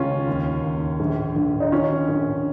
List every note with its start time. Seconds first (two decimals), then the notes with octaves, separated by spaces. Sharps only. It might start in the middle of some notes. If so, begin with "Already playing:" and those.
Already playing: C#2 D#3 C#4 F4
0.27 D#2
0.64 D#2
1.00 A#1
1.36 A#1
1.60 D#4
1.72 D#3 C#4 F4
2.09 A#1